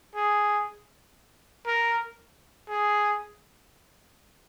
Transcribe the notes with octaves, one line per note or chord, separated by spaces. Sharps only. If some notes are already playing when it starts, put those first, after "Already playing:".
G#4
A#4
G#4